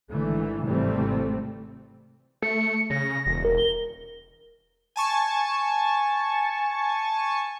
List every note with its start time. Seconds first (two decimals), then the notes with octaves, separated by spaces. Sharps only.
0.11 G#1 D3 E3 A3
0.64 G#1 C3 E3 G3 A3 C4
2.42 A3 C#7
2.90 C#3 A#6
3.26 E1
3.45 A#4
3.58 G7
4.96 G#5 A5 C#6